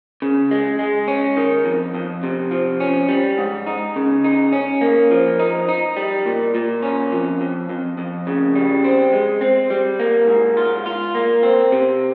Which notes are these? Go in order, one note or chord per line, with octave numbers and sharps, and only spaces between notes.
C#3
G#3
G#3
C#4
D#3
F2
F2
C3
F3
C#4
G3
G#2
D#4
C#3
D#4
C#4
A#3
F3
D#4
D#4
G3
A#2
A#2
C#4
F2
F2
F2
F2
C#3
G3
C4
G#3
C4
G3
A#3
G#2
F4
F4
A#3
C4
C3